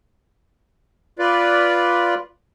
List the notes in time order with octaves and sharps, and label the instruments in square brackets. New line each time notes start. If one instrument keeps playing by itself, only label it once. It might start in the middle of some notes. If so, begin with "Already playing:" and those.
[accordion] F4 B4 D5